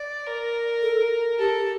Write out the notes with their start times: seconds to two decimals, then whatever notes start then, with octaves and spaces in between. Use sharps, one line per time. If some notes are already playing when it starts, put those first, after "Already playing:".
Already playing: D5
0.27 A#4
0.82 A4
1.39 G4 A4